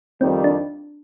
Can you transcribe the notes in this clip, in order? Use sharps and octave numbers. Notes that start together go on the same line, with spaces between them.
F2 D#3 G3 C4
D4